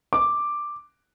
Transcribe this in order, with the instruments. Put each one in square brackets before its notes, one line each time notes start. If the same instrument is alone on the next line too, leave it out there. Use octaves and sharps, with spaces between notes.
[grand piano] D6